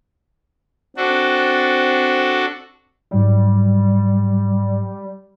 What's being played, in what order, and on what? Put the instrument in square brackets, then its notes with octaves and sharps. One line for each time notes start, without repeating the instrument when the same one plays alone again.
[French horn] C4 [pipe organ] D4 F#4 A4
[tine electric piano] G#2 F#3 [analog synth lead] G3